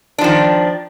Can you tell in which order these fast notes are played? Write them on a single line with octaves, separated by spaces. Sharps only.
D4 F3 D#3